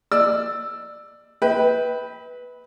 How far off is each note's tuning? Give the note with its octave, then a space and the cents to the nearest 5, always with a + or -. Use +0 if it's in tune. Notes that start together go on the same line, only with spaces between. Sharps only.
D5 +20 E6 +0
B4 +0 E5 -45 G5 +0